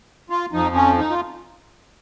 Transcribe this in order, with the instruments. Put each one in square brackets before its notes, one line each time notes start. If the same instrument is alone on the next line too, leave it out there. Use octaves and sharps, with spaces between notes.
[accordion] F4
F2 F3 D#4
C#4
D#4
F4